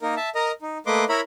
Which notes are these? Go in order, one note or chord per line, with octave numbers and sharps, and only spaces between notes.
A#3 D#4 A#4
E5 A5
A#4 D#5 A#5
D#4
A3 A#3 B4 D#5 C6 D6
E4 A#4 C#5 E5 A#5 B5